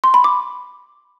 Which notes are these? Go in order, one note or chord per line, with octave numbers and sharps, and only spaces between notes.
C6
B5
D6